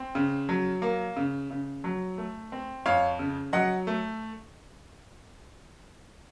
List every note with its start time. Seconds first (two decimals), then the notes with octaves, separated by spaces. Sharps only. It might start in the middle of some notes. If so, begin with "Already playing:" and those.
Already playing: C4
0.15 C#3
0.49 F#3
0.82 A#3
1.16 C#3
1.50 C#3
1.84 F#3
2.18 A3
2.52 C4
2.86 F2 C#5 F5
3.19 C#3
3.53 F#3 D#5 F#5
3.87 A3